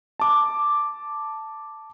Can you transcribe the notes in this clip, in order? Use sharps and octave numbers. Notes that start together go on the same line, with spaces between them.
A5 D6